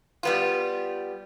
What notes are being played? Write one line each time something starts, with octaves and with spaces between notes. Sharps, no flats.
G3 B3 F4